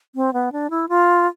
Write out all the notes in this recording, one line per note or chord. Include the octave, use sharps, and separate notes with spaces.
C4
B3
D4
E4
F4